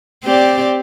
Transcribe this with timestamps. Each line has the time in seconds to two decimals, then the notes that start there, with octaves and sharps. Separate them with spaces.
0.24 C4 G4 D5